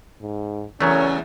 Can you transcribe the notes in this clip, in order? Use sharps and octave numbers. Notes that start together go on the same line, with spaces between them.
G#2
E2 C#3 F#3 A3 C#4 A#4 C#5